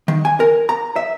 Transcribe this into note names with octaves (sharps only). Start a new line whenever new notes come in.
D#3
G#5
A#4
A#5
E5